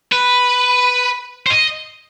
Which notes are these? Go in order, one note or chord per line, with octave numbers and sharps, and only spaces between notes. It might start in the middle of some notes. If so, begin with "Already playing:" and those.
B4
C5
D#5